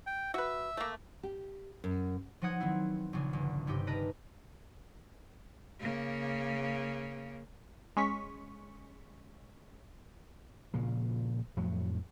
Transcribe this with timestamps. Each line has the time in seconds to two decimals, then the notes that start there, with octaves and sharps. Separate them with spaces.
0.06 G5
0.34 F#4 B4 E5
0.77 A3 A#3
1.23 G4
1.84 F#2
2.42 F3 F#3 D#4 F#5 D#6 G#6
2.60 D#3 B3 C4 E4
3.13 A#1 C#3 G#4
3.33 G1
3.67 G2 C3 D#4 G4
3.87 A#4 B4 D#5 A5 A#5
5.80 C#3 A#3
7.97 G#3 C#4 C#6 B6
10.74 A#2 C#3 F3
11.57 F2 A2 F3 F#3